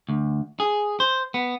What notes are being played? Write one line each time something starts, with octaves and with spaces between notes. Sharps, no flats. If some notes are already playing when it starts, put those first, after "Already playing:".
D2
G#4
C5
B3